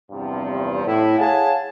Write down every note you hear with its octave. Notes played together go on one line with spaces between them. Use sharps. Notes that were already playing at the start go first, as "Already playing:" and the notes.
E2 G2 C3 F3
A2 E4
G#4 C#5 F5 F#5 G#5 A5